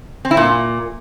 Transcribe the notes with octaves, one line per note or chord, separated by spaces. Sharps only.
C4
E4
A#2